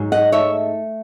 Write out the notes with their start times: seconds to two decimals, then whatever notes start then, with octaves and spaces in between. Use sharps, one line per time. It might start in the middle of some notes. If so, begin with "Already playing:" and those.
Already playing: G#2 F#3
0.12 D#5 F#5
0.32 A3 C#5 E5